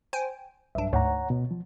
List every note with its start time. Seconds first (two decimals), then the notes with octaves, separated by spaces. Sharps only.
0.13 C5 G5 G#5
0.75 B1 G2 D4 E5
0.93 D2 G#2 C#5 F#5 A#5
1.30 B2
1.51 F3